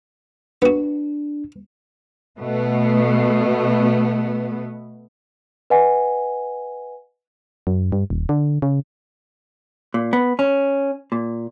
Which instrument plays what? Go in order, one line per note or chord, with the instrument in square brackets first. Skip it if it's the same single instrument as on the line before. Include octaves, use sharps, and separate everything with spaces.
[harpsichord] B3 F#4 [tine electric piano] D4
[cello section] B2 A3 B3
[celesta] B4 D#5 F#5 G#5
[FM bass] F#2
G2
D#1
D3
C#3
[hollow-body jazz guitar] A#2
B3
C#4
A#2